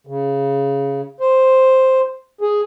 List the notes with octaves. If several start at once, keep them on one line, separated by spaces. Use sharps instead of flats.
C#3
C5
G#4